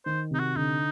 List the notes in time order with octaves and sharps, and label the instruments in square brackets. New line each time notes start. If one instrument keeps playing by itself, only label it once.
[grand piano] D#3 [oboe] C5
[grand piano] C3 [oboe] D#4
[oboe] F#4
[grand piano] D3 [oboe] D#4